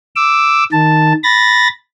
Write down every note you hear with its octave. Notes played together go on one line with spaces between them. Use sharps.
D6 E6
D#3 A5
B5 A6 A#6